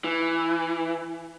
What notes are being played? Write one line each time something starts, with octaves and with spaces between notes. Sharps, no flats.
E3